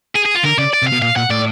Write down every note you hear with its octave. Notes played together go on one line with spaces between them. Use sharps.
G#4
G#4
F4
D3 A#4
C#3 D5
D5
C3
F5
B2
A#2 F5
A#2 F#5
A2 D5